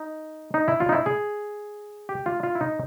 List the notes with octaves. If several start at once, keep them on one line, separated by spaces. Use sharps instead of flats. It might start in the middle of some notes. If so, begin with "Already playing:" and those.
Already playing: D#4
D#4
E4
F4
D#4
E4
G#4
G4
F4
F4
E4
D#4